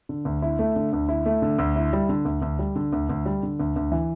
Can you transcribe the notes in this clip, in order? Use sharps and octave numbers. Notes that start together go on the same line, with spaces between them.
D3
D2
E4
A3
D3
D2
E4
A3
D3
D2
E4
G3
D3
D2
D2
G3
D3
D2
D2
G3
D3
D2
D2
E3